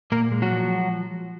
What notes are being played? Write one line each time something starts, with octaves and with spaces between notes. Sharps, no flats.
A#2 A#3 A#4
G#3
F#3 F#4
F3